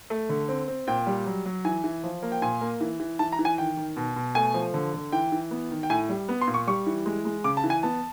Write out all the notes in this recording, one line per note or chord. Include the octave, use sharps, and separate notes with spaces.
A3
D3
C4
C4
A#2 G5
G3
F#3
F#3
E3 G#5
E3
F3
A#3
G5
A#2 G#5
A#3
E3
E3
E3 A5
A#5
E3
G#5
D#3 G5
D#3
B2
B2
A3 G#5
F3
D3
D3
E3 G5
E3
B3
D#3
G5
A2 G#5
G3
B3
C6
A#2
C#6
G3 C#6
E3
G#3
G#3
C#3 D6
A5
E3
G#5
B3 A5